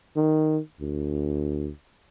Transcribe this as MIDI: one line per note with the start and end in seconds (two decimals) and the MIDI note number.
0.17 0.59 51
0.81 1.70 38